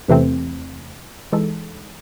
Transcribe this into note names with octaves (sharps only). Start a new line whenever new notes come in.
E2 C3 E3 A3 C4
E3 G#3 D#4 A4